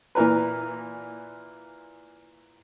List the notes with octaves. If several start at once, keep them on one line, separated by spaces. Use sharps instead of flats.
A#2 E3 A#4 B4